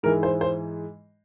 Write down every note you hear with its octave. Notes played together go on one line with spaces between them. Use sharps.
G#2 E3 G#3 A#4
C5
C5